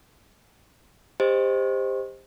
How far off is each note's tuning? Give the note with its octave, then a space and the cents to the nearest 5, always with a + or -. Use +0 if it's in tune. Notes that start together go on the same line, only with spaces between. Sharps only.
G4 +25 C5 +0 D#5 +0